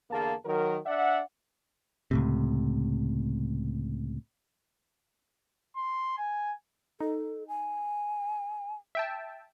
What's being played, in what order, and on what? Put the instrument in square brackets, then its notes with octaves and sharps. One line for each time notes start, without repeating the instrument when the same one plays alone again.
[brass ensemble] E2 D3 A#3 G#4 F5 A5
D#3 F#3 A#4
D4 D5 E5 F#5
[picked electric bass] C#2 A2 C3
[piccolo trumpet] C6
G#5
[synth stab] D#4 [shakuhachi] A4
[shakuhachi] G#5
[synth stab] E5 G5 A5